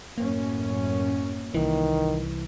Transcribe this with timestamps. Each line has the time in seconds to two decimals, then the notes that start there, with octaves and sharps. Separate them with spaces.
0.18 F#2 A2 A#3 C#4
1.54 C2 D#3 E3